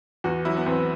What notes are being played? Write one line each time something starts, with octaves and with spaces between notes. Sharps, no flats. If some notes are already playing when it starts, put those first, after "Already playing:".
E2 F#4
F#3 E4
B3
E2 C4